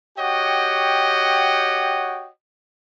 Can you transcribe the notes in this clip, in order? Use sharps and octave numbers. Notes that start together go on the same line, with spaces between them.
F#4 G4 C#5 D#5 F#5 G5